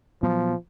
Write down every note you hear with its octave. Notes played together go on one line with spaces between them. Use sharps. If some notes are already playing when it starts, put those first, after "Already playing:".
A#2 F3 F#3 B3